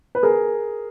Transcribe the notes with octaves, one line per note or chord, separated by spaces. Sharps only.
B4
G#4 A#4